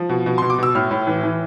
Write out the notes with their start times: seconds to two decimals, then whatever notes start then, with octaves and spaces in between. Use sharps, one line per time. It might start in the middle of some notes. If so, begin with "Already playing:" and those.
Already playing: F3
0.09 B2
0.26 B2
0.38 B2 C6
0.50 D6
0.58 B2 E6
0.75 A2 F6
0.91 A2
1.07 E3
1.23 E3